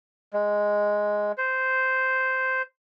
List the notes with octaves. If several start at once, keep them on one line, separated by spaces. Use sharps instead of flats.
G#3
C5